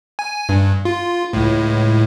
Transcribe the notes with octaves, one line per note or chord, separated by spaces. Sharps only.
G#5
G2
F4
C#2 A2